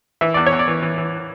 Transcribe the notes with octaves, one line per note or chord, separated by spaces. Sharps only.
E3 E5
E2 D5
C#5
E2
D5
E3
E3
E3